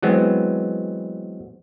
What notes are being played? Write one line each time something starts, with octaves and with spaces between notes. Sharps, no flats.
E3 F#3 G#3 B3 C4